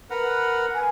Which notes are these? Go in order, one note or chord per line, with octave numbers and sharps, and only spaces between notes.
A#4 B4 F#5
G#5